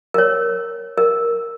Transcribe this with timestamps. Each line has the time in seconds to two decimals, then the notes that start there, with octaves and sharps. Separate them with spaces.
0.14 A#4 C#5
0.98 A#4